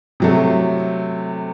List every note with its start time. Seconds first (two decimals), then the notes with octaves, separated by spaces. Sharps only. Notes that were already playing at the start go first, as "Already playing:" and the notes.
0.20 C3 F#3 A3